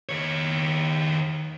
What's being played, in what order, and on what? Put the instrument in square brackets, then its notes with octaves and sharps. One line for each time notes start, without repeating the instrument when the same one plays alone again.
[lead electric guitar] D#3 C#5